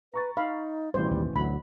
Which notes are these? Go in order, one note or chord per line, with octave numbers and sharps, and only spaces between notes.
B4 A#5 C#6 A6
D#4 F5 B5
A1 B2 E3 G3 C5
D#2
D2 F#3 B5